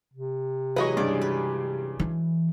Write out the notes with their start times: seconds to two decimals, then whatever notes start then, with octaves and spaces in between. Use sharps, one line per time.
0.14 C3
0.76 E3 F#3 G#3 B4 D#5 C#6
0.97 G2 C#3 D5
1.22 B4
1.99 E3